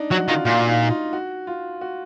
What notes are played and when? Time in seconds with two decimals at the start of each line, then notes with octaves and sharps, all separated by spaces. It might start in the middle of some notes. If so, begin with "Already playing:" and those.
Already playing: D4 D#4
0.11 F#3 F#4
0.28 D#3 F4
0.45 A#2 F4
0.67 D#4
0.83 D#4
0.90 F4
1.13 F#4
1.47 F4
1.81 F#4